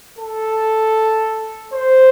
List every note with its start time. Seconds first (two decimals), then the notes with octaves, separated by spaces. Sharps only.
0.18 A4
1.73 C5